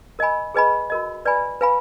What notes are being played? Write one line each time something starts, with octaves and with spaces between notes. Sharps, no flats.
A#4 D#5 G#5 B5
G#4 B4 D#5 G#5 B5
F#4 A#4 D#5
B4 D5 G#5 B5
B4 F5 G#5 B5